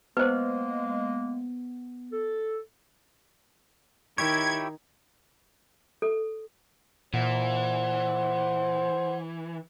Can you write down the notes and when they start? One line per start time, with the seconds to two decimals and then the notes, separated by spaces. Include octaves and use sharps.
0.17 G#3 A#3 B3 B4 C5
2.12 A4
4.18 D#3 E4 G4 C#5 G#6
6.02 A4
7.14 A#2 E3 C5 F#5